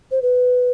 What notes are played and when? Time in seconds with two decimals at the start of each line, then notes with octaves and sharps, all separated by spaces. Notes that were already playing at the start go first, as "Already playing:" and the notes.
0.11 C5
0.22 B4